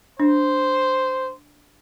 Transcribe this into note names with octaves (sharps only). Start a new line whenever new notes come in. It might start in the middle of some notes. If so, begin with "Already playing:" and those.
D4 C5